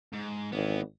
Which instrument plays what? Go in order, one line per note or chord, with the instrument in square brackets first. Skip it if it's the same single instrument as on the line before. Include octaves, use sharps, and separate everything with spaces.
[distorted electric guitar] G#2
[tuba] G#1 [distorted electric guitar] E3 B3